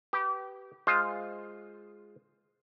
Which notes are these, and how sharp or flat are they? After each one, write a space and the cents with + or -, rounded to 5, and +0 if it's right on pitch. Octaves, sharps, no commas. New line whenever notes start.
G4 -25 B4 +0 A5 +0
G#3 +0 F4 +0 C5 +0